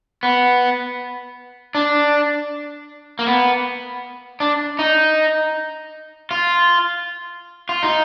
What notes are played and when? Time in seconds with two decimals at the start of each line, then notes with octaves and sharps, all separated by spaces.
0.23 B3
1.75 D4
3.19 A#3
3.27 B3
4.40 D4
4.79 D#4
6.31 F4
7.69 F4
7.83 D#4